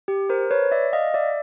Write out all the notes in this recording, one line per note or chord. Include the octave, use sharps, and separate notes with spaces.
G4
A#4 C5
B4 C#5
D5 E5
D#5 F5
D5 E5